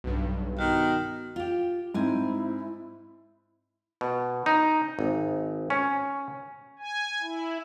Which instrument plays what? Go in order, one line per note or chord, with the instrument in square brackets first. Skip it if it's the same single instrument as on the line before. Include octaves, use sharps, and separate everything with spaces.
[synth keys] B1 G2
[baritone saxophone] D#3 [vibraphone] B3 F#4
[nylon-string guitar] F4 G4
[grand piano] G#2 [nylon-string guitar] C4 G#5 [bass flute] E4
[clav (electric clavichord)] B2
D#4
G#1
C#4
[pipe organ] G#5
E4